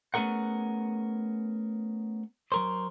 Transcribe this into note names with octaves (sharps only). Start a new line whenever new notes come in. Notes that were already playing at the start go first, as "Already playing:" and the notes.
A3 B3 C#4 G#4 A#4 F#5
F#3 A#4 C5